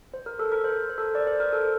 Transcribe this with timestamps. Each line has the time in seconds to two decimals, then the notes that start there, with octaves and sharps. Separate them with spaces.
0.14 C5
0.26 A#4
0.39 A4
0.52 A#4
0.64 C5
0.90 C5
0.98 A4
1.02 A#4
1.15 D5
1.27 C5
1.40 A#4
1.52 A4